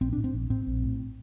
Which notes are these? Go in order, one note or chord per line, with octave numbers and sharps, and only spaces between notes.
A#1 C4
A2 D4
C4
A#1
A2 C4
A#1
A2